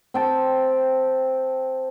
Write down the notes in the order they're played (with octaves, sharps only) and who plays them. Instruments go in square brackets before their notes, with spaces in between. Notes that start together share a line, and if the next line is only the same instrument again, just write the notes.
[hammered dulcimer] C4 G5 A5